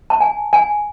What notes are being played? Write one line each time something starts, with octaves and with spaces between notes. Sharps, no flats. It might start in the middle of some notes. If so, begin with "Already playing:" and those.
A5
G#5
G#5